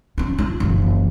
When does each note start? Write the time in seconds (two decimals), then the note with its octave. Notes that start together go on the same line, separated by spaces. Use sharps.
0.18 C#4 F4
0.38 F4
0.60 F#1 E3